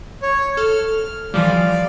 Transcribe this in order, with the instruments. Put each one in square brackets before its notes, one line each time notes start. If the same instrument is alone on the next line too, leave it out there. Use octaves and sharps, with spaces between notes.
[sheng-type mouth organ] C#5
[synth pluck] A4 [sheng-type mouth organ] F6
[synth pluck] E3 F3 G3 [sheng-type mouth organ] D5 F5